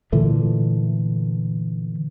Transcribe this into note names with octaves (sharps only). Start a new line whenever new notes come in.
A#2 D3 E3 A3